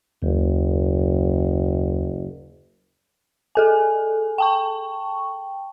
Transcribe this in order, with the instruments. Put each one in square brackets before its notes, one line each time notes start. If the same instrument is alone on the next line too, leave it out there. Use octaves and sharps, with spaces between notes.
[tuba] F#1 [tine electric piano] D#2
[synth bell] G#4 A4 G#5
G5 A5 C#6